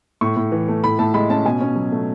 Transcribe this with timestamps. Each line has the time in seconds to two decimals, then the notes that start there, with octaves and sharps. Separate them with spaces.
0.21 A2 C#6
0.36 A2
0.52 E3
0.68 A3
0.84 A2 B5
0.99 A2 A5
1.14 G#3 B5
1.29 C#4 A5
1.45 B2 G#5
1.60 C#4
1.76 F#3
1.92 A3